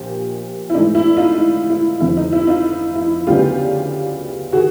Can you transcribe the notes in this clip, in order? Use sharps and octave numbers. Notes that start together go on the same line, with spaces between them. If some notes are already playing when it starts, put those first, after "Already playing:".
Already playing: A#1 A#2 G4
E4
G#2 E3 A3 D4 D#4
E4
D#4 F4
D#4
E4
F1 F2 D3 E4
D#4
E4
D#4 F4
E4
D2 C#3 F#3 B3 D4 F4 G4
D#3 F#4 G#4